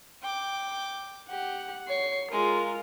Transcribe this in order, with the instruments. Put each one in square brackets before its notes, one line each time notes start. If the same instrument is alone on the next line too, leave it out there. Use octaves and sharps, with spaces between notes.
[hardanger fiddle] G5 D6
[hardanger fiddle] G4 [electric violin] F#5
[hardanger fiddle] C#5 [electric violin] C7
[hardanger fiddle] G#3 [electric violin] F4 A#4